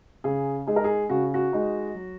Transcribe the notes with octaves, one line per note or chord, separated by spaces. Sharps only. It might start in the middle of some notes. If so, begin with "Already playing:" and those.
C#3 G#4
G#3 D#4 G#4
A#4
G#4
C#3 F#4
F#4
G#3 D#4
F#3